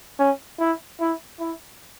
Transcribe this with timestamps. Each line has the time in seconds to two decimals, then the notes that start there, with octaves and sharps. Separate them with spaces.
0.19 C#4
0.60 E4
1.01 E4
1.40 E4